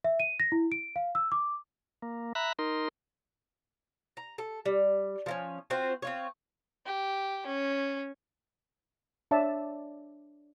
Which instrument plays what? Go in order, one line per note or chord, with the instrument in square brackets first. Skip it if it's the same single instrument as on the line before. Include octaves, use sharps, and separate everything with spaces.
[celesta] E5
D#7
A#6
E4
D7
F5
E6
D6
[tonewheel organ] A#3
E5 A#5 B5 F#6
D#4 A#4 C6
[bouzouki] A#5
A4
G3
F3 A#3 C#4
C4 F4 F#4 C5
C4 F4 C#5
[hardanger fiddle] G4
C#4
[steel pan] D4 C#5 D5 E5 A5